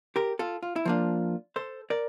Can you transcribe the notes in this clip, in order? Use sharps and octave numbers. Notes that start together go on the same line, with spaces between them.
G4 A#4
F4 A4
F4
E4
F3 A#3 D4 F4
A4 C5
A#4 D5